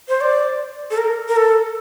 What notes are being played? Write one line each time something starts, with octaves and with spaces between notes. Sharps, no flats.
C5
D5
A4
A#4
A#4
A4